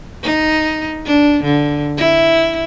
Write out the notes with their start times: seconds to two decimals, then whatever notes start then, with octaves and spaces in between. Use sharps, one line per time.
0.23 D#4
1.06 D4
1.44 D3
1.98 E4